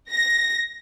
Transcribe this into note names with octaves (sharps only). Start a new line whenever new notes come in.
A#6